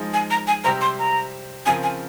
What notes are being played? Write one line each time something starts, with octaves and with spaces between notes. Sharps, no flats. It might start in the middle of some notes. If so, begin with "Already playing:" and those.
Already playing: F3 G#3 D#4
G#5
A#5
G#5
C3 G3 C4 G4 C5 A#5
C6
A#5
C#3 F3 C4 F4 A#4 G#5
G#5